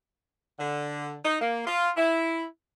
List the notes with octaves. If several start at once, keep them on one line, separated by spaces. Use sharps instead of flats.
D3
D#4
A#3
F4
E4